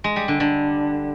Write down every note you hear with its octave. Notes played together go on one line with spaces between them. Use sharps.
G#3
G3
D3
D3